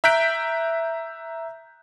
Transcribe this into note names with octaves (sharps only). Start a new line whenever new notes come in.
E5 A#5 F#6 G6 B6 D7